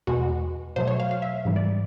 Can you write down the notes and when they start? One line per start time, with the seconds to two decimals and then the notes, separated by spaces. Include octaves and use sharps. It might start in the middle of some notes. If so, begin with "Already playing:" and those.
0.07 E2 B2 G#3 F#4
0.76 B2 F#3 A3 C5
0.87 C#5
1.00 F5
1.11 F5
1.22 E5
1.45 G#2 E3 G3
1.56 D5